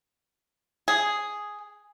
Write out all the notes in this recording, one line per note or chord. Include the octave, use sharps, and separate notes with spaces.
G#4